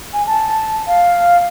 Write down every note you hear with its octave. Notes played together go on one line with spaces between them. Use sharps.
G#5
A5
F5